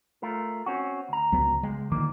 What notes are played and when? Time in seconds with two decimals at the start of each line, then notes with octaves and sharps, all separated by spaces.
0.22 A3 F4 A#4
0.66 C4 C#4 F#4
1.09 D2 A#5
1.32 C#2 F#3 B3
1.63 C#2 G#3
1.92 D3 D#3 F3 A#3